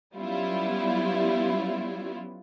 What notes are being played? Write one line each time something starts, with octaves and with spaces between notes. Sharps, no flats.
F#3 G3 B3 C#4 E4 F4